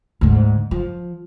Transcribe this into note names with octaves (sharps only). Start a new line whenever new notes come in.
D2 G#2
F3